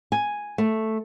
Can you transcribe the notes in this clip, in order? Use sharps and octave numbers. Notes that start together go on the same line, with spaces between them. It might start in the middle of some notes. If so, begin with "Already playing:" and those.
G#5
A3